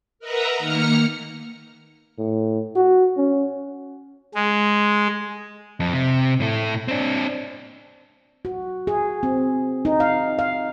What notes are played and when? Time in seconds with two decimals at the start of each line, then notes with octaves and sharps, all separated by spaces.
0.19 A#4 B4 D#5 E5 F#5 A#5
0.58 D#3 A#3 A#5 F6 A#6 C#7
2.18 A2
2.76 F#4
3.17 C#4
4.35 G#3
5.80 F2
5.93 C3
6.40 A2 A3
6.88 C4 D4
8.45 F#4
8.87 G#4
9.23 C4
9.85 D#4
10.00 F5
10.39 F5